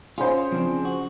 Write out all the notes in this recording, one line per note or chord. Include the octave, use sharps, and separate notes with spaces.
C#4 F4 G#4 C5
C#3 F3 C4 D4
F#4